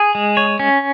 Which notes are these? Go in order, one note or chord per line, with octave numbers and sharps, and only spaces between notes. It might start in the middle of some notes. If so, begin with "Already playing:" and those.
Already playing: G#4
G#3
C#5
C#4